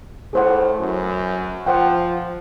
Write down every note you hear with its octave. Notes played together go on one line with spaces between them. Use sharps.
A2 G#4 C5 F#5
F#2
F3 C5 F#5 G5